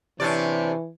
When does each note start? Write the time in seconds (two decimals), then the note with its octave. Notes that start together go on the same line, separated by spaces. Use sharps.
0.20 C3 E3 C#4 D4 D5